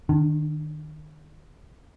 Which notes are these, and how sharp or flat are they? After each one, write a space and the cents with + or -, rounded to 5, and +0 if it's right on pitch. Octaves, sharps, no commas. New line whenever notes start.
D#3 -25 D4 +10